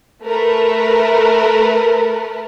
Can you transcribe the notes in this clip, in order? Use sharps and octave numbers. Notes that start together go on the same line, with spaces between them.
A3 A#4 B4